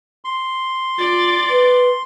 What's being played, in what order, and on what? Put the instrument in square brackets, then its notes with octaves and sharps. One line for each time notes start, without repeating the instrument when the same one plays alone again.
[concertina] C6
[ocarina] F4 [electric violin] D5 A6
[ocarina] B4